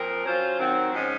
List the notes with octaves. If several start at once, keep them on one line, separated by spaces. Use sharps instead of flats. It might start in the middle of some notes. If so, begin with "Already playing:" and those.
Already playing: A#2 F3 C4 A#4
F#3 C#4 F4 C5
D#3 F#3 C4
G#2 F3 G#3 C#4